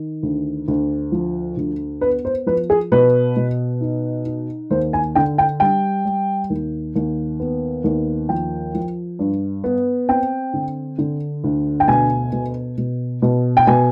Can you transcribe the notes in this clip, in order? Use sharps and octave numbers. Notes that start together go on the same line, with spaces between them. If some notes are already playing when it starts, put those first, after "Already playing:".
Already playing: D#3
D2
D2
F3
D2
B3 B4
C5
F3 B4
G#4
B2 B4
B2
D#4
D#4
D#2 C5
G#5
D3 G5
G5
G3 G5
G3
D#2
D#2
B3
D#2
F3 G5
F3
G2
B3
C4 G5
D3
D3
D2
G5
B2 G#5
B2
B2
B2
G5
B2 G#5